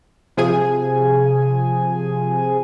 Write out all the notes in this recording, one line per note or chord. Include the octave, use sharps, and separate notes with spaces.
C3 F3 G#4 G#5